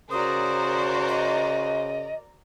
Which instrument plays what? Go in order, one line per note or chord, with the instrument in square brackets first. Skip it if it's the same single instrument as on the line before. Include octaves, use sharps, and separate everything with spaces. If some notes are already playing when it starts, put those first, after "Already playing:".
[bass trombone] C#3 [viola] F#4 C5 [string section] A#4 D5 A#5 [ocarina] D#6
[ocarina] D#5